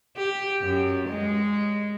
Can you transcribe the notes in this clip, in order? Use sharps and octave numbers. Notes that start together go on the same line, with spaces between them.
G4
F#2
G#3